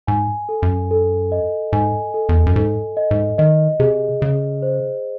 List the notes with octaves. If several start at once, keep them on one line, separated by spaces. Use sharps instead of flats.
G#2 G#5
A4
F#2
A4
D#5
G#2 G#5
A4
E2
F#2
G#2 A4
D#5
G#2
D#3 D#5
C3 G#4
C#3 G#4
C5